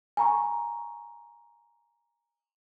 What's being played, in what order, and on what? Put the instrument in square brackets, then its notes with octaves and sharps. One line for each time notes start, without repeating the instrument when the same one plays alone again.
[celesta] G#5 A#5 C#6